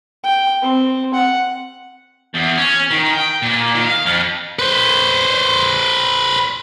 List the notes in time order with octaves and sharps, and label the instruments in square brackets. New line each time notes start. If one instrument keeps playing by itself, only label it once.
[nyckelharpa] G5
C4
F#5
[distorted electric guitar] E2
C#4
D#3
G5
A#2
D#3
F5
F2
B4 C5